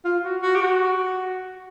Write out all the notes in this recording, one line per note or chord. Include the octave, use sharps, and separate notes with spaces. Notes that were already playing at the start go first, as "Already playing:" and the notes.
F4
F#4
F#4
G4
F#4